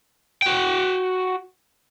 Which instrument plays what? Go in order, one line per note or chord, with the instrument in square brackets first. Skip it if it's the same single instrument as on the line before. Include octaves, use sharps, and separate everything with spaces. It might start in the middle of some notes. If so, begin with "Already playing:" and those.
[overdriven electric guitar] F#4 G5